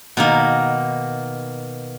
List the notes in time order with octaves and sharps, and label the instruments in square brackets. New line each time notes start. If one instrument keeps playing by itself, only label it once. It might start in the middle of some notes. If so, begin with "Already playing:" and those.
[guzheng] B2 D#3 A#3